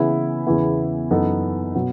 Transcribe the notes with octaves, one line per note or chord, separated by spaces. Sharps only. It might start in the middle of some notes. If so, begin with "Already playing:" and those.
Already playing: C#3 E3 B3 E4 B4
E2 C#3 E3 B3 E4
F#2 E3 B3 D#4 A4
B2 F#3 B3